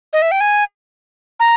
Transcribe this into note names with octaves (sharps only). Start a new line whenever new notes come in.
D#5
E5
G5
G#5
A#5